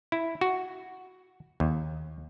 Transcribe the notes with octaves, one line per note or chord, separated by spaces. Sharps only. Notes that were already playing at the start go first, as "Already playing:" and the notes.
E4
F#4
D#2